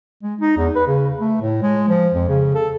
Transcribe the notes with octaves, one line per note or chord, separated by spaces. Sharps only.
G#3
D#4
E2
B4
C#3
A3
A2
G#3
F3
F2
C#3
A4